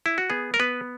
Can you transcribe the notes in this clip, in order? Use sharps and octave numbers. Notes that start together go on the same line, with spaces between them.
E4
F#4
B3 G#4
A#4
B3 B4